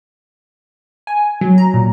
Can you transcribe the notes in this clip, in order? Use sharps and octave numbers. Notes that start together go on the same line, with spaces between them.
G#5
F#3
A#5
A#2